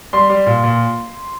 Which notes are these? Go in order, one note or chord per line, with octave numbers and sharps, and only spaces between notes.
G3 C6
G3
A#2
A#2